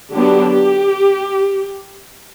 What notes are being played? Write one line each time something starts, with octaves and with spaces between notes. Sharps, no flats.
D3 F#3 B3 D4 G4
G4